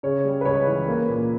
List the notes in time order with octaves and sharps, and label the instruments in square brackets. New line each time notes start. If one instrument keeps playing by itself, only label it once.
[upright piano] C#3 C#5
G3
B4
C#2 C#5
E3
A#3 B4
A#2